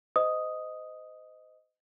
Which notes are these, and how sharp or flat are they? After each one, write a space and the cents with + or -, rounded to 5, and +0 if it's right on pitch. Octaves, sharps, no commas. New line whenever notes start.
C5 -35 D#5 +0 D#6 +0